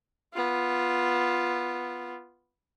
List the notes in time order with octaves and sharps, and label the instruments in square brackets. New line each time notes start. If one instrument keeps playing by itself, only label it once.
[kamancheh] B3 F4